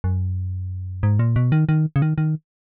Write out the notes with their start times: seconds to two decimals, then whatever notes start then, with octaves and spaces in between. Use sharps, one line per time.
0.04 F#2
1.03 G#2
1.19 A#2
1.36 B2
1.52 D#3
1.69 D#3
1.96 C#3
2.02 D#3
2.18 D#3